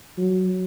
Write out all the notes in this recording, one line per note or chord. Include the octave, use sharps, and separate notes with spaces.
F#3